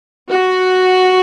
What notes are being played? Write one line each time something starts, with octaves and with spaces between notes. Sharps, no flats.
F#4